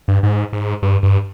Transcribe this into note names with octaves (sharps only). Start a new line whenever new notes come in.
G2
G#2
G#2
G2
G2